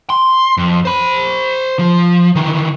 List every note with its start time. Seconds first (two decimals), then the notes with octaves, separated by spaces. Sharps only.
0.10 C6
0.57 F2
0.85 C5 B5
1.79 F3
2.35 D#3 E3